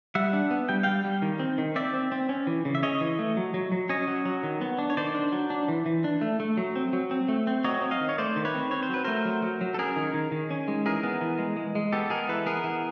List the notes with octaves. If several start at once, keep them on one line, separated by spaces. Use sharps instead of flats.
G3 E5 F#5
D4
B3
G3 G5
G3 F5 G5
G3
D#3
C4
D#3
C4 D5 E5
C4
C4
C#4
E3
C#3
E5
C#4 C#5 D#5
E3
A3
F#3
F#3
F#3
C#4 C#5 D#5
F#3
F#3
D#3
B3
D4
C#5
D#3 C5 D5
D4
F#3
D4
E3
E3
D4
A3
A3
F#3
C4
F#3
C4
A3
C4
F#3 C#5 D#5
C4
D#5 F5
D#3
C#5
A3 C5 D5
D#3
B4 C#5
C4
C4 C#5
C5
F#3 B4
A3 A#4 C5
F#3
F#3
F#3
A4
C#4 G#4 A#4
D#3
D#3
D#3
C#4
G#3
E3 G#4 A#4
B3
E3
G#3
G#3
G#3
B3 G4 A4
G#3 G#4 A#4
E3 A4 B4
B3 G#4 A#4
E3